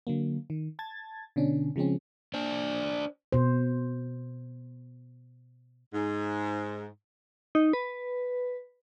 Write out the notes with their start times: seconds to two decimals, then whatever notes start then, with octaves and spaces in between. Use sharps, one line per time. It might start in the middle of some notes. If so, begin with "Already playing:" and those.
0.07 D3 F#3 A#3
0.50 D#3
0.79 A5 G#6 A6
1.36 B2 D3 C#4 D4
1.76 C#3 F3 G#3 C4 C#4
2.34 D4 C5
3.32 B2 C5
5.94 G#2
7.55 D#4
7.73 B4